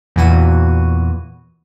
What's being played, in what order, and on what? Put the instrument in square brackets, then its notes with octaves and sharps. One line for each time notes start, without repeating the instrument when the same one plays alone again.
[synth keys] E2 A#2 E3 F#4 D#7